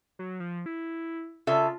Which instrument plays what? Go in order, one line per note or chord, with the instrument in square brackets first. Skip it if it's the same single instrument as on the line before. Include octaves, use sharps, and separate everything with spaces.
[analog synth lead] F#3
F3
E4
[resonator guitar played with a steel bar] C#3 A4 E5 [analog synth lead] F4